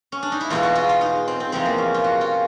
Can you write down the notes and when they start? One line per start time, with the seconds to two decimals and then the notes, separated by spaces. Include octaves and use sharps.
0.12 C#4
0.23 D4
0.32 D#4
0.41 E4
0.50 E2 B2 G#3 F4
0.63 F#4
0.75 F4
0.89 F4
1.01 D#4
1.28 C4
1.40 C4
1.52 E2 C3 F3 G#3 C4
1.66 A#3
1.78 C#4
1.94 F4
2.04 F#4
2.21 F4